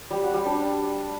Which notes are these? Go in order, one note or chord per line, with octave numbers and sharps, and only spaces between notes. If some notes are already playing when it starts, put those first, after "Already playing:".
G3
F#4
G3
D4